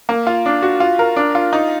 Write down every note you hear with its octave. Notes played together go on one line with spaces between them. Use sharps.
A#3
F4
D4
F#4
F4
A#4
D4
F4
D#4